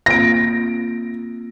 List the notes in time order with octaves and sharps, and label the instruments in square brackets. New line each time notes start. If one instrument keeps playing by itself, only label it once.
[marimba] A#3 C4 F4 [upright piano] A#6 D7